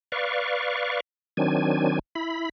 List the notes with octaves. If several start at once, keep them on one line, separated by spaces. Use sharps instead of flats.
B4 D5 F5 C#6
D#3 F#3 C4 D4 G#5
E4 B5